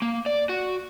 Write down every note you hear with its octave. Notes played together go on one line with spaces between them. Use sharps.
A#3
D5
F#4